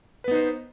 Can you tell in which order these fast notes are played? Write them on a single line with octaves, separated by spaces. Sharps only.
B4 B3 D#4 C5